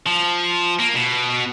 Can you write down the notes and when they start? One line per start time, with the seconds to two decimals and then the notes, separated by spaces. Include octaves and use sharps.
0.07 F3
0.80 A#3
0.95 B2